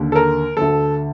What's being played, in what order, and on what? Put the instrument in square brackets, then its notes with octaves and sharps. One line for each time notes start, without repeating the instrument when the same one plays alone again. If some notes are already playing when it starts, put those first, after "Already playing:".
Already playing: [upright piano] D#2 D3
A4
A#4
D2 D3 A4